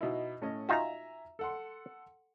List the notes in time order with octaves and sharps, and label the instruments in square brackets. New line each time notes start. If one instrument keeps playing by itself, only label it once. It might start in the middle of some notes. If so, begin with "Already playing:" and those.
[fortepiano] B2 D#4 E4
A2 C#4 D#5
[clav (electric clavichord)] D#4 F4 F#4 [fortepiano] E5 G#5 A#5
[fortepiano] A4 F#5 C6